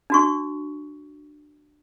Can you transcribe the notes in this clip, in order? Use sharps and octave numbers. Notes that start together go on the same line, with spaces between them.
D4 F#4 C#6